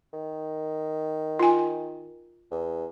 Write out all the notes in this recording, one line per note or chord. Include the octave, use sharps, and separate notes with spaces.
D#3
F4 G#5
E2